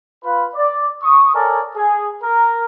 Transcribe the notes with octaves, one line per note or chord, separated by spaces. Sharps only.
F4 B4
D5
C#6 D#6
A4 A#4 C#5 D5 G#5
G#4
A#4